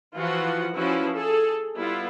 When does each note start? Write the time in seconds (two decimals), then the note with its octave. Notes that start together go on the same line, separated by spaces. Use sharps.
0.15 E3 F3 F4 F#4 F#5
0.74 F3 C#4 E4 F#4 B4
1.14 G#4 A4
1.77 G3 B3 E4 F4